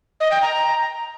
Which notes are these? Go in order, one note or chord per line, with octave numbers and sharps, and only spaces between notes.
D#5
G5
A#5